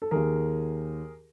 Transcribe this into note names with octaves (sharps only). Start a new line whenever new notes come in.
A4
D#2 D#3 G#4 A#4